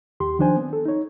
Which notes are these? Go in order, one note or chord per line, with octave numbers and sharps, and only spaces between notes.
D#2 G4 C6
D#3 F3 D4 C5 G#5
B3 C4
A4
D#4 C#5